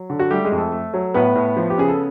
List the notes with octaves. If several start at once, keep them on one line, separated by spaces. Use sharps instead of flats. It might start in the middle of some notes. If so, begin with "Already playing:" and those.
Already playing: F#3
D3
F#4
G3 A3 G4
G#3 G#4
F2
A3 A4
A3
F#3
A2 B3 B4
A2
F3
G4
C#3 G#4
A4